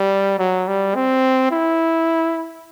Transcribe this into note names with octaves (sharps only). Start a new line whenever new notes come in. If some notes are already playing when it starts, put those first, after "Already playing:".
Already playing: G3
F#3
G3
C4
E4